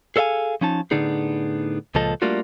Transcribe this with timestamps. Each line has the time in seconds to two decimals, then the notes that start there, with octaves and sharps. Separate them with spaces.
0.16 G#4 A4 C#5 E5 F5 G#5
0.61 F3 C#4 D#4 A5
0.91 A2 D3 B3 D4 D#4 G#4
1.95 C#2 A#2 F3 A4 D#5
2.22 G3 A3 A#3 D4 F4 F#4